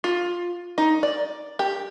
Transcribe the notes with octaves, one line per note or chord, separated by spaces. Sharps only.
F4
D#4
D5
G4